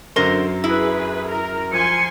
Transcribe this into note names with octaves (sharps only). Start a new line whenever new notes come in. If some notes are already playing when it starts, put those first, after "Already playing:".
F#2 D3 A#4 C5 G7
E4 G#4 B4
A#4
F3 G#5 C6 C#7